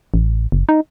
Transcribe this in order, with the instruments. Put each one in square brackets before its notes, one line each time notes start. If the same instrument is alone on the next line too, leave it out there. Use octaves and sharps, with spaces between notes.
[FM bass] A1
F#1
D#4